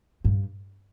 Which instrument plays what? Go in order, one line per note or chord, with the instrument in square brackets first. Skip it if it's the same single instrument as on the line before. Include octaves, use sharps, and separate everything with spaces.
[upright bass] G2